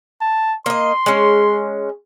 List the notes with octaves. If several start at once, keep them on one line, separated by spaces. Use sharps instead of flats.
A5
A#3 D#5 C6
G#3 C#4